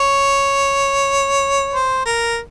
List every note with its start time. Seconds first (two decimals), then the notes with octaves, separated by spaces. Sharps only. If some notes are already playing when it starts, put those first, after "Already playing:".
Already playing: C#5
1.74 C5
2.05 A#4